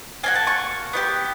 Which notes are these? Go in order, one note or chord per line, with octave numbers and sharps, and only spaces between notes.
A#3 D4 F#4 G#5
A5
C#6
B3 D#4 G4